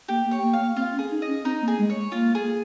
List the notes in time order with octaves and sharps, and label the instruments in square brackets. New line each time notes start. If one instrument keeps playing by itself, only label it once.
[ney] A#3 [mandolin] G4
[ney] A#3
[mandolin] C#5
[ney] A#3
[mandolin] F5
[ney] A#3
[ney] C4 [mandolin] F4
[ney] C#4
[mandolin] G#4
[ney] D#4
[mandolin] D#5
[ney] C#4
[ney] C4 [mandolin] D#4
[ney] A#3
[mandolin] G#4
[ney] G#3
[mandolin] C#5
[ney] G#3
[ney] A#3 [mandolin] F4
[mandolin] G#4